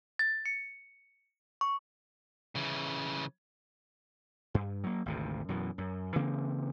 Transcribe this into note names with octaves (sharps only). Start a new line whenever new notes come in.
A6
C#7
C#6
C#3 E3
G2
F#3 A#3
G#1 D2 C3
F#2 B2 E3
F#2
C#3 E3 A#3 C4